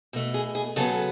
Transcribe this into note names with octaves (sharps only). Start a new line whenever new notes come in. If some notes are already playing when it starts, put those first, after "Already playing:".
B2 A3
G#4
G#4
C#3 F#3 B3 A4